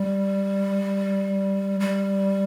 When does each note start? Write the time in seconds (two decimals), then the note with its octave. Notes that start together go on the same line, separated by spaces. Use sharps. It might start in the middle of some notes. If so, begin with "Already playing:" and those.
Already playing: G3
1.80 G3